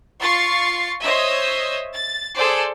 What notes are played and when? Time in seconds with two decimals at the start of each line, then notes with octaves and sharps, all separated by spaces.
0.21 F4 C#6 A6 C7
1.02 C5 C#5 D#5 E5
1.94 A6
2.35 G#4 A4 C5 D5